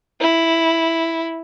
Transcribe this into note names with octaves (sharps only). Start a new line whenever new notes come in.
E4